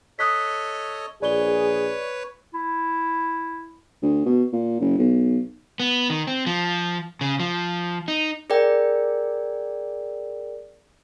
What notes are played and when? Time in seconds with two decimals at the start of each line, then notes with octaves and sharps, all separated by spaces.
0.19 A4 C#5 D#5 D#6 F#6 B6
1.22 A#1 G#4 B4 C#5 D5 G7
2.54 E4
4.02 D2
4.26 B2
4.53 A#2
4.80 F#1
4.98 B1
5.80 B3
6.10 D#3
6.27 C4
6.47 F3
7.21 C#3
7.40 F3
8.08 D#4
8.50 G#4 A#4 D5 G5